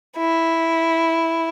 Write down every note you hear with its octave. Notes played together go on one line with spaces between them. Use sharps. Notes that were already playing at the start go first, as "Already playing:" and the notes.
E4